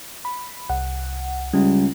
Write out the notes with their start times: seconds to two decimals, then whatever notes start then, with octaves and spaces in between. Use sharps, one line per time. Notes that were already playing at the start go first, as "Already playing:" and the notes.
0.25 B5
0.69 C2 F#5
1.53 C#2 G3